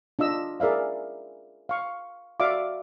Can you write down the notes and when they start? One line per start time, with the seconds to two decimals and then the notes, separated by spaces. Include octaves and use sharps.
0.19 D4 F4 D#5 E6
0.60 G#4 A#4 D5 E5 F5
1.69 F5 C#6
2.40 F#4 D5 E5 F5 D6